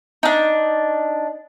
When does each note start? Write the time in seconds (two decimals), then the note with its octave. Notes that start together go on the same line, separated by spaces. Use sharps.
0.23 D4 D#4